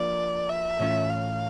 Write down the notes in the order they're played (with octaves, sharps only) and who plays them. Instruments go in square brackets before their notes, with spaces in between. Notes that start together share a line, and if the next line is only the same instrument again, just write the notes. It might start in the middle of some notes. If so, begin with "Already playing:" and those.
Already playing: [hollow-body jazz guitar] F3 A#3 D4 [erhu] D5
[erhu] E5
[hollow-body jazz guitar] A2 E3 A3 C#4 F4
[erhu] F5